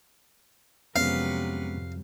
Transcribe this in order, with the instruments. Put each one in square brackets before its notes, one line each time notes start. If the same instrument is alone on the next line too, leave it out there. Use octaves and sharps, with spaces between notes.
[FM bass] F2 [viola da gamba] C3 F#3 B4 [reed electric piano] G#3 B3 C#4 [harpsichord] F5